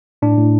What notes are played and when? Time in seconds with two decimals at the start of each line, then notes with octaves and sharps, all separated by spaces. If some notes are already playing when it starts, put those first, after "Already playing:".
0.22 A2 D4
0.38 A2